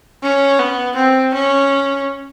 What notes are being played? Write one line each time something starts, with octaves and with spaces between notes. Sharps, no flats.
C#4
B3
C4
C#4